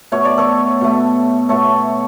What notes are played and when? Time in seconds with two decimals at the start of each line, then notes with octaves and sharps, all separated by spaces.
0.12 B2 A3 C#5
0.25 D5
0.38 A4 C#5
0.81 B2 A3
1.49 B2 A3 A4 C#5